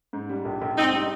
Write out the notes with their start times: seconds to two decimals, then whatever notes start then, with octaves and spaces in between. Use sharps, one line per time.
0.13 G#2
0.29 G3
0.45 A#1
0.62 A#1
0.77 G#2 C4 D#4
0.93 G3